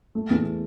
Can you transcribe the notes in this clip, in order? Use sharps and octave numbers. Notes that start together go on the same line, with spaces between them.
A3
E2